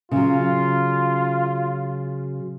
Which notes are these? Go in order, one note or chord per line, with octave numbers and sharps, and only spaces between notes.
C#3 F#3 F4